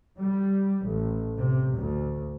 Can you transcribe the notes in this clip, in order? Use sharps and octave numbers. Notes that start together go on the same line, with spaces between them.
G3
A1
C3
D2